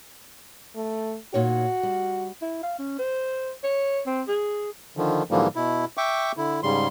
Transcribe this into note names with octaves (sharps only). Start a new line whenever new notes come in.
A3
A#2 D#4 F#4 C#5
G3
E4
F5
C#4
C5
C#5
C4
G#4
D3 D#3 F3
G#2 D3 E3 F3 G3 A#3
B2 E4
E5 G5 C#6 D6
D3 E4
G#2 C#3 G3 C6